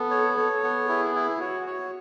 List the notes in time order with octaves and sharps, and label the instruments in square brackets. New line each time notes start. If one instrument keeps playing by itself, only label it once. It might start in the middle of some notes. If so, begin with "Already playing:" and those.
Already playing: [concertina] B3 [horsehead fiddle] A4
[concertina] C#5
[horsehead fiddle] A4 [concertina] C#5
[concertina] B3
[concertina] E4 [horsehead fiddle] G#4
[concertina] E4
[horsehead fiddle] F#4 [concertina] C#5
[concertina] C#5